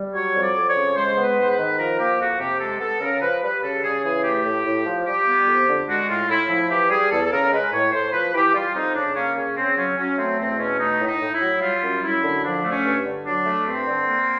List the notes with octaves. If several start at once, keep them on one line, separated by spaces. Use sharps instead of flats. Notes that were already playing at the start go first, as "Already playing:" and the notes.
Already playing: G3
F#3 C#5
F2
D5
F2
C#5
C#3
G#3 C5
B3
B4
G#2 C5
B4
D#3
F3 A#4
A#3 G4
F2 F#4
C3 G4
G#3 A4
B3 A4
C#3 A#4
F3 B4
G3 B4
C#3 A4
C#3 G#4
E3 G#4
A3 G4
A2
A2
F3
G3 G4
B3
F2
D3
G#3 F#4
A2 F4
A2 E4
F3 E4
E3 G4
G3 G#4
E2 A4
A4
C#3 A#4
G#3 B4
A2 C#5
A2 C5
F3 B4
E3 G4
G3 F4
F2 D#4
C#3 D4
A#3 C#4
C#3 C#4
C#3 C4
F#3 C#4
F#3 C#4
A3 C4
E2 C4
B2 C#4
A3 D#4
A2
D#4
A2
E4
F#3
G3 F4
F#2
F#2 E4
D3
F3 D4
A3
C#4
G2
D3
F#3 D4
A3
G2 C4
D3
A#3